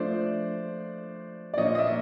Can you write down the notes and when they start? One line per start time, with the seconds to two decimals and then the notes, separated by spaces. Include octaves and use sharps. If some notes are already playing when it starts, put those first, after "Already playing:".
Already playing: F3 A3 D4 C5 D5
1.54 D5
1.57 A#2 F3 A#3 D4 C#5 D#5
1.75 D#5
1.78 D5 E5